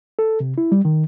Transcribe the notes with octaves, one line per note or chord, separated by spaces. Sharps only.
A4
C3
E4
G3
D#3